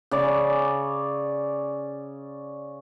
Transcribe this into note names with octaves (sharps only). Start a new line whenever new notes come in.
C#3 C#5 D5